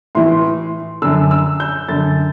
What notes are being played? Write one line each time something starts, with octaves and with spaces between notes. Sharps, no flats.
A2 E3 C6
F#2 D3 E6
E6
G6
F#2 D3 A6